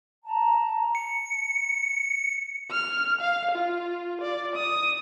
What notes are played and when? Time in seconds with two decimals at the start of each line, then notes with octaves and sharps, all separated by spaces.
0.23 A5 A#5
0.95 C#7
2.71 F6
3.21 F5
3.51 F4
4.21 D5
4.56 D#6